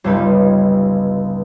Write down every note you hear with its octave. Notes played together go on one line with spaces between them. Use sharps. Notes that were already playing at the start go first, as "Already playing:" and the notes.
G1 C#2 G2 G3 D#4 B4